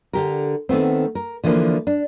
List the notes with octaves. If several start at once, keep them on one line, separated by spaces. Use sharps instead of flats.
D3 G4 A#4
D#3 A3 B3 C4
A#4
D3 E3 F3 A#3 D4
D4